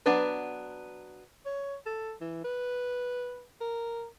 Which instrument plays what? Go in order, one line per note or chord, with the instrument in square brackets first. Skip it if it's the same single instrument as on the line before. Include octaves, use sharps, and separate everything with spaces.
[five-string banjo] F#3 B3 D4 B4
[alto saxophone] C#5
A4
E3
B4
A#4